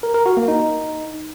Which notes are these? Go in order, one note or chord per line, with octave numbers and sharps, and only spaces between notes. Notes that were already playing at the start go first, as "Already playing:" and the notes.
A#4
A#4
F#4
A#3
D#4